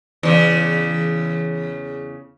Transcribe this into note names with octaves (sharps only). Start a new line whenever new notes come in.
E2 C#3